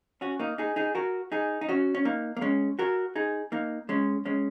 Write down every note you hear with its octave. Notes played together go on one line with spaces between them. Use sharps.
C#4 F#4
A#3 D#4
D#4 G#4
D#4 G#4
F#4 A#4
D#4 G#4
D#4
C#4 F#4
C#4
A#3 D#4
A#3
G#3 C#4
F#4 A#4
D#4 G#4
A#3 D#4
G#3 C#4
G#3 C#4